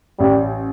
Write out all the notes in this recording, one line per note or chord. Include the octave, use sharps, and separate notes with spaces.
A1 G3